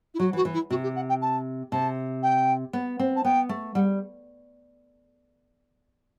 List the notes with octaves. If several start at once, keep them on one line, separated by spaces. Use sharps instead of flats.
E4
F#3 F#4
E3
F#4
E3
E4
C3 F#4
G4
F#5
G5
A5
C3 A5
G5
B3
C4
A5
B3 G5
A3
G3 F#5